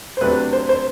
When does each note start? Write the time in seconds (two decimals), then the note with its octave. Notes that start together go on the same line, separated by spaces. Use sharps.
0.17 C5
0.21 C3 F#3 A3 D4 B4
0.53 C5
0.69 C5